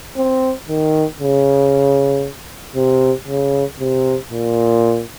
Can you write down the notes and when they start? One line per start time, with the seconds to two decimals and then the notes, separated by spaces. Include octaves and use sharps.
0.16 C4
0.69 D#3
1.20 C#3
2.76 C3
3.28 C#3
3.80 C3
4.31 A#2